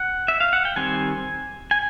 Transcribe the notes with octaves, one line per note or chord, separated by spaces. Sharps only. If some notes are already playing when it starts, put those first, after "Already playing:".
Already playing: F#5
E5
F5
F#5
G5
D#3 G3 C4 G#5
G#5